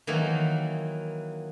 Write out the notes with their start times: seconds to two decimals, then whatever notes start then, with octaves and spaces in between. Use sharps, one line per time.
0.07 D#3 E3 F#3 A#3